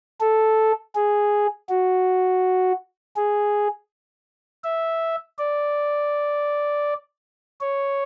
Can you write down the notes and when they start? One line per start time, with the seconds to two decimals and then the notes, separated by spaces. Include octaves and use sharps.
0.20 A4
0.95 G#4
1.69 F#4
3.16 G#4
4.64 E5
5.39 D5
7.61 C#5